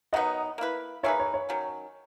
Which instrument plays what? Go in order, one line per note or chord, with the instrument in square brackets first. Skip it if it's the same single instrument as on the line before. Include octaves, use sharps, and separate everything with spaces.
[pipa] D#3 F#3 B3 D#4 [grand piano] D#5 F#5
[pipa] A#3 E4 B4
[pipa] A#3 D#4 G#4 B4 [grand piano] C#5 E5
[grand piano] C#5
C#5
[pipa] D#3 F#3 C#4